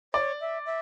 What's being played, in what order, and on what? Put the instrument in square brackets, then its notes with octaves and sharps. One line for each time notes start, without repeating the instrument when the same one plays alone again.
[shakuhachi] C#5 [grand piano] D5
[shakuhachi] E5
E5